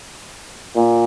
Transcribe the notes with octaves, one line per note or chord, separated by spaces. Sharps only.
A#2